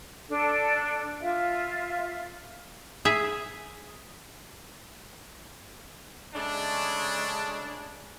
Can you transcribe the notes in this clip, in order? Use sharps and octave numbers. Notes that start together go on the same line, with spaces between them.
D4 A4
F4 E5
G#4 E5
C#3 G#3 A3 D4